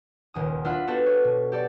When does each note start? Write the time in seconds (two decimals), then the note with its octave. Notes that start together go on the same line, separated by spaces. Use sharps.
0.34 D#1 C#2 D#6
0.64 D4 F4 E5 F#5 B5
0.87 B3 D4 F#4 G4 A4 B4
1.06 C#5
1.24 B2
1.52 G4 A4 D5